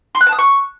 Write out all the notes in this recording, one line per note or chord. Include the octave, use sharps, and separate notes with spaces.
C6
F#6
A5
D#6
C#6